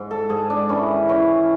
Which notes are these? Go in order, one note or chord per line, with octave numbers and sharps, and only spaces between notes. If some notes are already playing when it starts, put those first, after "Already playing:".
Already playing: G#2
A4
G#2 G#4
D4
E3 C#4
E3 C#4